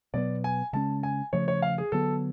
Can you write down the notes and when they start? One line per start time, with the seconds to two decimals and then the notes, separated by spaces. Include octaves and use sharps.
0.14 B2 F#3 B3 D5
0.44 G#5
0.73 C#3 G#3 C#4 A5
1.03 G#5
1.33 C#3 F3 A3 C#5
1.48 C#5
1.62 F5
1.78 G#4
1.92 D3 F#3 B3 A4